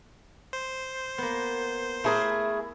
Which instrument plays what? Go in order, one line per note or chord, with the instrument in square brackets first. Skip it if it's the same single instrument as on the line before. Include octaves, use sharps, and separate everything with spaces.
[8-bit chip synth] C5
[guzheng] A#3 B3
[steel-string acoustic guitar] A3 G#4 A#4 [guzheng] E4